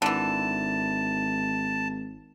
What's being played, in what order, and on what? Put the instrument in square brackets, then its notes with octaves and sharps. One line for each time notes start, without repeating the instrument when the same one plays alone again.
[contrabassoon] G#1 [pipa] D3 E3 [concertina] A5